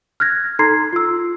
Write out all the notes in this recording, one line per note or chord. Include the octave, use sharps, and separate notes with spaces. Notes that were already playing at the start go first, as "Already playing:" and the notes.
F6 F#6 G#6 A#6
D#4 A4 A#5 C6 G#6 C7
F4 E6